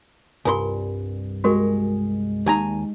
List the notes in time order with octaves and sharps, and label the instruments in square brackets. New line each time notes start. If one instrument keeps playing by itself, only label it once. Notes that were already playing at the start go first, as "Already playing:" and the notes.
[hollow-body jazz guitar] C2 G2 C6 [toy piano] F4 A#4 G#5
[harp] G#3 [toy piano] F#4 G4 A#4
[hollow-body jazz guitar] D#2 G#5 A#5 [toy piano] D#4 G4